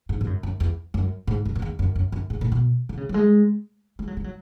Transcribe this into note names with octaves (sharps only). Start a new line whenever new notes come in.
G#2
G#2
F#2
F#2
E2
F#2
G#2
F#2
F#2
E2
F#2
F#2
F#2
G#2
A2
B2
D3
C#3
F#3
G#3
G#3
F#3
G#3
F#3